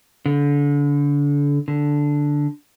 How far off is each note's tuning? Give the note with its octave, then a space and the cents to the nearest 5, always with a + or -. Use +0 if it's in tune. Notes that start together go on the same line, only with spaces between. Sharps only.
D3 -30
D3 -5